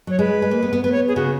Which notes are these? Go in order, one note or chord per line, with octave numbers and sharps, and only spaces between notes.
F#3 C#5
G#3 B4
G#3
A#3
B3
B3
B3 B4
C#5
G#4
C#3 F#4